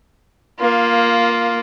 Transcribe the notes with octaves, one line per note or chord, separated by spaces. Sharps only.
A#3 F4